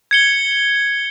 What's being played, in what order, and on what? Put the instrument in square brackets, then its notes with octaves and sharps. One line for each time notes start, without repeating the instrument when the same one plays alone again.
[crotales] G#6 C#7 G7